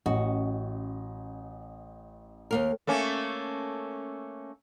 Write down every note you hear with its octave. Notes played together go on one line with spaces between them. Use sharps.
A1 C#4 F#4 D#5
D#2 A#3 A#4
A3 A#3 C#4